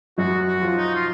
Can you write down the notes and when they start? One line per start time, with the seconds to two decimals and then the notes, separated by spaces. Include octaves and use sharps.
0.18 F#2 F#3 F#4
0.47 F#4
0.61 F3 F4
0.77 D#4
0.95 F4